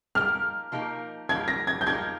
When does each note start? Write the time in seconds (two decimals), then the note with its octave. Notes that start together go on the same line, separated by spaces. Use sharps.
0.15 F3 A#3 D#4 G4 A#4 F6
0.72 F3 A#3 D#4 G4 A#4
1.29 F3 A#3 D#4 G4 A#4 G#6
1.48 A#6
1.67 G#6
1.81 G6
1.86 F3 A#3 D#4 G4 A#4 G#6